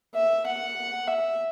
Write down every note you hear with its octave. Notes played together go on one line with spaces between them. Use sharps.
E5
F#5
E5